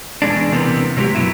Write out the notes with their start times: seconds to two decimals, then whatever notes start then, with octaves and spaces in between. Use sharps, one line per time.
0.22 E2 B2 G#3 D4
0.52 C3 E3 A#3 B3
0.97 C3 F#3 G#3 G4
1.15 F#2 B2 F#3 E4